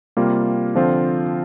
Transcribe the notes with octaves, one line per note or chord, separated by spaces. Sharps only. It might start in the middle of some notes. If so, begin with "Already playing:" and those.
C3 G3 A#3 F4
D3 F3 C4 F4